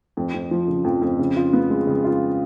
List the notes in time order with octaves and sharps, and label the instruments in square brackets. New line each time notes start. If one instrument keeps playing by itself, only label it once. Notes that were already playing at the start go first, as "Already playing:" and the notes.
[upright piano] F2
F2
F3
C#3
F2
F2
C#3
F4
B3
G#3
C#3
F4